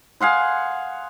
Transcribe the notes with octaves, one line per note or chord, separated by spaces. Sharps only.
G#4 F5 F#5 C6